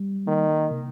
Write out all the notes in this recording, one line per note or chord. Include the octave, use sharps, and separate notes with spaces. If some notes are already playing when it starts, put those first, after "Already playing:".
Already playing: G3
D#3 A#3
C3